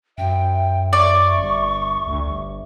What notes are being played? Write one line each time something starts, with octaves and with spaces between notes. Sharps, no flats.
F#2 E5 G5
D5 C#6
G1
D2
G1